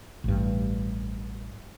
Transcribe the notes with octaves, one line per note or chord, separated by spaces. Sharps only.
A1 G2